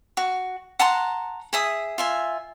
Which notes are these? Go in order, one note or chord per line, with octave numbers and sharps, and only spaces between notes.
F#4
F#5 A5 A#5 C6
G#4 E5 D#6
F4 E5 G#5